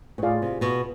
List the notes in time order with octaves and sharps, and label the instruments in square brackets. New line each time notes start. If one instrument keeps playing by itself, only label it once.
[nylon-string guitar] B2
[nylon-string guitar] A2 [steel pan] F4 G#4 D5 F5
[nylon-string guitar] C3
B2